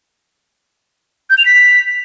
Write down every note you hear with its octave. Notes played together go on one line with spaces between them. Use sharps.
G6
F7
B6